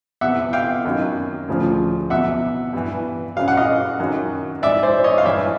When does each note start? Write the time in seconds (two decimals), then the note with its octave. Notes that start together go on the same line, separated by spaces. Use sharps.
0.21 E2 C3 E3 E5 F#5
0.53 F5 G5
0.85 F#2 D#3 F#3
1.48 D2 C#3 F3
2.10 E2 B2 F#3 E5 F#5
2.73 G2 E3
3.36 F#2 C#3 F#3 F5
3.48 F#5
3.57 D#5 F5
4.00 F#2 D#3 F#3
4.62 G#2 E3 D5 E5
4.83 C5 D5
5.04 C#5 D#5
5.18 F5
5.25 G2 E3 D5 E5